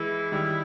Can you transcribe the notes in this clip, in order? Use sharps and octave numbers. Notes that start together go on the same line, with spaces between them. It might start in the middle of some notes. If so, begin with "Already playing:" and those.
Already playing: E3 G#3 E4
D#3 G3